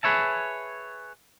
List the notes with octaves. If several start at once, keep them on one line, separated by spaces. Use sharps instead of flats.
G#4 A4 B4 C#5 E5 A5